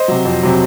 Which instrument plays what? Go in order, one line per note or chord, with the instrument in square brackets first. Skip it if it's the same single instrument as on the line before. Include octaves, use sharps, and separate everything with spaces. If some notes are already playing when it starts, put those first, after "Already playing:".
Already playing: [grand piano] C5 D#5
C3 F#3
F2
C3 F#3